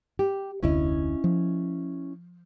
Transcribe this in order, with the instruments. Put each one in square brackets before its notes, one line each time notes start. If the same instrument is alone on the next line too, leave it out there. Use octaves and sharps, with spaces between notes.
[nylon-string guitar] G4
[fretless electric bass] F1 D2 [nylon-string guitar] C#4 E4 D#5
[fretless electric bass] F3